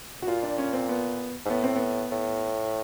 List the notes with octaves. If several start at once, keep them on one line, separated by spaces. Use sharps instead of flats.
F#4
A#2 F4
D4
C#4
C4
B3
G#2
A2 B3
C4
B3
A2